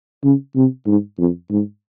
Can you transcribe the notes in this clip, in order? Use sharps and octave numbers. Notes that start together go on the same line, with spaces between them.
C#3
C3
G#2
F2
G#2